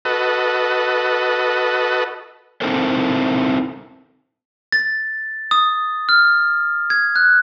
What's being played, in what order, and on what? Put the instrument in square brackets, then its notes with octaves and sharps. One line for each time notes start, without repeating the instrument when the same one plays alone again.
[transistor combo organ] F#4 A4 B4 D#5
[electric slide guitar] C4 D#4 E4 A4 A#4 C5
[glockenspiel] A6
D#6
F6
G#6
F#6